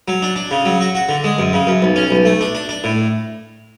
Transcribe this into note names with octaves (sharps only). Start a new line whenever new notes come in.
F#3
D4
D4
C#3
F#3
F#4
F#4
D3
G#3
F#2
C#3
F#2
B1
C#4
B1
A3
D4
D4
D4
A2